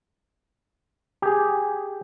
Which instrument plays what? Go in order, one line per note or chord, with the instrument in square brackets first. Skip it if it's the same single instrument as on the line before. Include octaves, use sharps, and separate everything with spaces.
[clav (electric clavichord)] G4 G#4